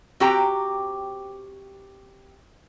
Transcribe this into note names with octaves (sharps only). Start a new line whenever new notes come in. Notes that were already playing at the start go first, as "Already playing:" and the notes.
C4 F#4 G4 G5 A#5